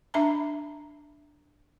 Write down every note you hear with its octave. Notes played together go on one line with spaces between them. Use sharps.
D4 E5 A5 A#5